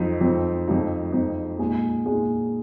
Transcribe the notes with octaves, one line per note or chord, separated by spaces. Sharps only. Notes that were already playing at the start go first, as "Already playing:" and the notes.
Already playing: F2 F3 C4 D#4
F2 F3 C4 D#4
F2 F3 C4 D#4
F2 F3 C4 D#4
A#2 G#3 D#4 G#4
A#2 G#3 D#4 G#4